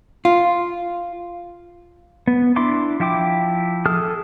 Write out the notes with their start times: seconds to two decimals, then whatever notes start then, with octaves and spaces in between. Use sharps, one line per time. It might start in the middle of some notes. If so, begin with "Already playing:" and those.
0.25 F4
2.27 B3
2.56 D4 E4 B5 C6 D6
3.00 F3 E4 G5 D6
3.86 G#4 A4 A5 D#6 F6